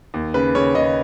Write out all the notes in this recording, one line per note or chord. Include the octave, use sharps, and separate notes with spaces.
D#2
C#3 B4
C#3 C#5
C#3 D#5